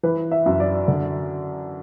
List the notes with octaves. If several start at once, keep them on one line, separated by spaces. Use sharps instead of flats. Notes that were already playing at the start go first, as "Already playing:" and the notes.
E3 B4
E5
F#2
D5
D3